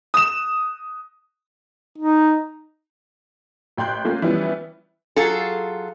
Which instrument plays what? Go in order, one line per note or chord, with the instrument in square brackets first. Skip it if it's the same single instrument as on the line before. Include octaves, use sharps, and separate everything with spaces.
[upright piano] D#6 E7
[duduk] D#4
[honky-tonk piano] A1 G5 C6 F#6 G6
A3 A#3 C#4 F4
E3 F3 G3 B3 C#4 E4
[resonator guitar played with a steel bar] F#3 F4 G#4 A4